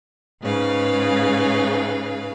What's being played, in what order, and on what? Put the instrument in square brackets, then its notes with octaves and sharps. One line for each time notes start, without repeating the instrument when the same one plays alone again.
[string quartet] G#2 C#3 B4 F5